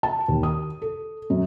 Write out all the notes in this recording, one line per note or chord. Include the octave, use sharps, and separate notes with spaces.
A5
D#2
D#6
A4
F#2